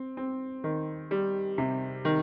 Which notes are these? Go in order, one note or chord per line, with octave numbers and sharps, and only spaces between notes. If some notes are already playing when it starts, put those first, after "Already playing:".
Already playing: C4
C4
D#3
G3
C3
D#3